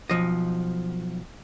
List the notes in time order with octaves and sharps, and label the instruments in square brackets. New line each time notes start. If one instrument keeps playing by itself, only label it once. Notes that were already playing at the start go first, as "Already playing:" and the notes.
[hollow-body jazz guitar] B1 F3 D#5